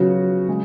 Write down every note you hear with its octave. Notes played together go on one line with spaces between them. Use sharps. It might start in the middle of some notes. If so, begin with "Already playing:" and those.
Already playing: C#3 F3 F#3 B3 F#4
C#3 G#3